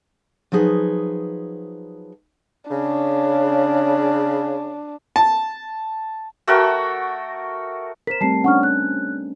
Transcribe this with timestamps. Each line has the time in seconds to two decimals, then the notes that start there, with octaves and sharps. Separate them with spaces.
0.52 F3 F#3 D#4 G#4 B4
2.71 C#3 D4
5.16 A5
6.47 A3 F#4 A#4 G5
8.07 A#4 C5 B6 E7
8.21 G3 A3 C4 A5 C7
8.44 C#4 D4 F#5 C#6 F6
8.63 F#6